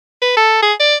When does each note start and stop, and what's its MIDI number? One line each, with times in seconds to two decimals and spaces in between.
0.22 0.34 71
0.37 0.59 69
0.62 0.73 68
0.80 0.96 74